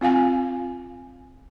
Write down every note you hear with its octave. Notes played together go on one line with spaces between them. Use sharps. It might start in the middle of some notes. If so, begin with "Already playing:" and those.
C4 F4 F5 G#5